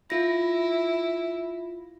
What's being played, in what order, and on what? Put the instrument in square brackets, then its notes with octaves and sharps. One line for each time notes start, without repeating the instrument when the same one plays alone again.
[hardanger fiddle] E4 [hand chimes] F4 A#6